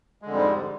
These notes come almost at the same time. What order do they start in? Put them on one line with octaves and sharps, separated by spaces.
G#3 D3 F2 G3 G#2